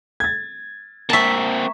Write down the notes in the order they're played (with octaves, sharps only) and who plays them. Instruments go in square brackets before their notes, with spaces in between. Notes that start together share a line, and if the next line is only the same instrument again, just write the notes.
[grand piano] G#6 A6
[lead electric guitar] A#3 C4 [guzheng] E5 A5 [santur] A#5 C#6